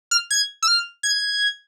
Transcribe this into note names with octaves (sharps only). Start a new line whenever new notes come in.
F6
G#6
E6
F6
G#6